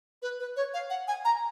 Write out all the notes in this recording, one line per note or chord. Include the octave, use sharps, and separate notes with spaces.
B4
B4
C#5
F5
F#5
G#5
A#5